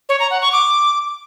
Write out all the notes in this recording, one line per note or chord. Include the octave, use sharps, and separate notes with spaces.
C#5
A#5
F#5
C#6
D6